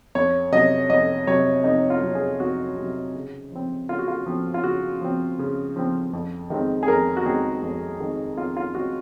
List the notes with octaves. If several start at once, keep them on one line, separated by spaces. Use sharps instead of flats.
F2 C#5
C3 F#3 D#5
F2 D#5
C3 F#3 C#5
F2 D#4
F4
C3 F#3
G#4
F2 F#4
C3 F#3
C#3
F3 C4
C#3 F4
F#4
F4
F3 C4
F4
C#3 F#4
F3 C4
C#3
F3 C4
F2
D#3 G#3 C4
G#4
F2 A#4
F#4
D#3 G#3 C4 G#4
F2
D#3 G#3 C4
F2 F4
F4
D#3 G#3 C4 F#4